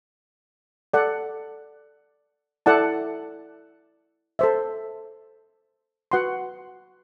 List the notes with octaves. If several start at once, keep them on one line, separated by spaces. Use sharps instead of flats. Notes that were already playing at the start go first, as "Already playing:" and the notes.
A4 D5 F#5
E4 A4 D5 F#5 A5
A4 C5 E5
F#4 B4 F#5 C6